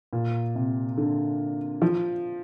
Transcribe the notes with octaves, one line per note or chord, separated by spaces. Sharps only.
A#2
C3
D3
F3